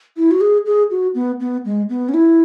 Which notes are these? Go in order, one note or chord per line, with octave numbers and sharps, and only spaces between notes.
E4
F#4
G#4
G#4
F#4
B3
B3
G#3
B3
C#4
E4